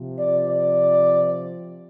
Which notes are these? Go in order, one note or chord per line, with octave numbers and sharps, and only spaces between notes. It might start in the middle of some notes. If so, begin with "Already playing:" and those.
Already playing: C3 F3
D5
D5